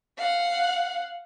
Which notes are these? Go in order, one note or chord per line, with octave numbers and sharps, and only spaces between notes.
F5 F#5